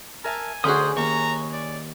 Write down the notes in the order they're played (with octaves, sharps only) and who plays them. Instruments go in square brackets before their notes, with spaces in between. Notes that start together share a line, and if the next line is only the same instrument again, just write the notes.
[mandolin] A#4 E5 A5 [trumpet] G#5
[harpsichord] D2 F#4 [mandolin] C#4 G#4 [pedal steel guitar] C5 C6 D#6
[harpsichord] D#2 [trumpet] A#5 [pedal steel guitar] C#6
[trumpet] D5